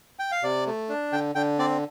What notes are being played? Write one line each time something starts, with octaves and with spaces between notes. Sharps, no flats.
G5
F5
C3 D5
A3
D4
D3 G5
D3 G5
C4 D5